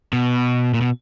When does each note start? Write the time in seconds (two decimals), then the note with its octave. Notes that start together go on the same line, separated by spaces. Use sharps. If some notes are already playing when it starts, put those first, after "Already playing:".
0.13 B2
0.74 A#2
0.81 B2